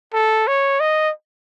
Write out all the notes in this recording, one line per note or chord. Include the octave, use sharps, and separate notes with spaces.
A4
C#5
D#5